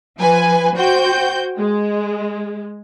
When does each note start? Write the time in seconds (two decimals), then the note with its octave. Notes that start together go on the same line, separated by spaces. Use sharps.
0.18 F3 B4 G#5
0.75 F#4 C5 G5 G6
1.58 G#3